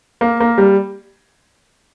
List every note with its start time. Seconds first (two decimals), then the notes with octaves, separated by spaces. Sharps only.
0.21 A#3
0.40 A#3
0.58 G3